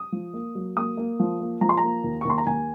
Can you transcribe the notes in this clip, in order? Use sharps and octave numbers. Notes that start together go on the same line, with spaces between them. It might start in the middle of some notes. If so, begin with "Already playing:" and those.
Already playing: D#6
F3
A#3
F#3
A#3 D#6
A#3
F3
A#3
F3 A#5
C6
A#5
A#3
D#2
C#6
D#2 C6
A#5
D#2 G#5